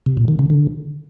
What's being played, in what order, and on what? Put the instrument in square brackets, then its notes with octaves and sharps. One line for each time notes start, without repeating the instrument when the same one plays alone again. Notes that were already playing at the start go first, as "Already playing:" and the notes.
[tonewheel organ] C3
A#2
D#3
C#3
D3